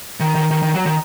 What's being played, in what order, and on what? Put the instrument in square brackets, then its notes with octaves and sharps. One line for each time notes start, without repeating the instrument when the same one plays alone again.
[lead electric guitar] D#3
D#3
D#3
D#3
F#3
D#3